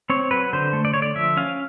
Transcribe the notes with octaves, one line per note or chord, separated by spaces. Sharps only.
C4 C#5
F#3 B4
D3 C5
A3
D5
D3 C#5
D5
F3 E5
C#4 F5